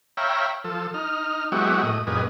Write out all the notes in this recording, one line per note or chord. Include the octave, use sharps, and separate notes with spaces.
C#5 E5 F5 G5 A#5 B5
F3 A4
D#4 F6
F#3 G#3 B3 E4 F#4 G4
A2 D#5
F#2 A#2 G3 G#4 B4 D#5